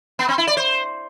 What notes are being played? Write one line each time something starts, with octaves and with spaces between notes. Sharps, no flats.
B3
C4
E4
D5
C5